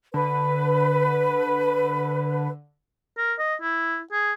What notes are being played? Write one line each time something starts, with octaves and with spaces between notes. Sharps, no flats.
D3 B4
A#4
D#5
E4
G#4